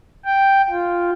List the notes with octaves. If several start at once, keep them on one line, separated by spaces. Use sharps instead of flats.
G5
F4